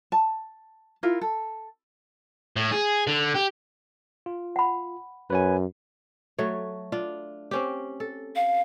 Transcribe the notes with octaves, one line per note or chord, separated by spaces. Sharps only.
A5
E4 F4 A#4
A4
A2
G#4
D3
G4
F4
F#5 B5
F#2 B4 C#5 G#5
F#3 A3 C#5
D4 F4
C4 C#4 G4
A4
F5